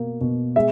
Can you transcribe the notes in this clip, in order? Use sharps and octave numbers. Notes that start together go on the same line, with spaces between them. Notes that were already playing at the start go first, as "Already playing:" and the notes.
Already playing: B2 A#3
B2
G#3 E5